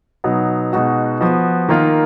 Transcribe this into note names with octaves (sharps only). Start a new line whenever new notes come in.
B2 F#3 B3 D#4
B2 G#3 D#4 F#4
F3 B3 F#4
D#3 A#3 F4